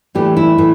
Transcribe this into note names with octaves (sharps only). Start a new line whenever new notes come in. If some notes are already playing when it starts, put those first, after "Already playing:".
A2 E3 A3 D4 G4
E4
A2 E3 A3